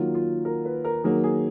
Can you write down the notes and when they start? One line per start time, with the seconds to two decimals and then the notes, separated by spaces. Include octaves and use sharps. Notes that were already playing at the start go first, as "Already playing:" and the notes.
Already playing: D#3 F#3 A#3 F4
0.15 F4
0.45 A#4
0.65 B4
0.85 A#4
1.04 D#3 F#3 A#3 G#4
1.24 G#4